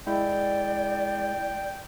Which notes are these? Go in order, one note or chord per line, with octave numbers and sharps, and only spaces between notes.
G#3 E4 D5 G5